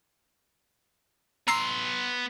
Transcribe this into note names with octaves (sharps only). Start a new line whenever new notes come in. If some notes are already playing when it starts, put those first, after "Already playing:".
B3 A#5 C6 E6 C7